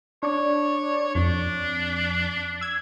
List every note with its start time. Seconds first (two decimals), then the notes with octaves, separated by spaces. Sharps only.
0.23 D4 C#5 D5
1.15 F2 D4
2.61 E6 G#6